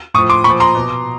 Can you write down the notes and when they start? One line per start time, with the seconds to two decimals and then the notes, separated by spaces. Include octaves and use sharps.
0.14 A2 C#6 D#6
0.18 F3
0.30 C6 D6
0.44 A#2 B5 C#6
0.50 F3
0.60 A#5 C6
0.75 B2